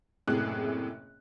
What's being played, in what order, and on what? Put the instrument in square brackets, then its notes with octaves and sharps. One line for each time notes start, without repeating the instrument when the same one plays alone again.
[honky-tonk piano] F#1 A2 C3 G#4 F#6